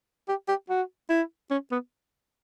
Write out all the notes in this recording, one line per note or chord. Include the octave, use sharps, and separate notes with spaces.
G4
G4
F#4
E4
C#4
B3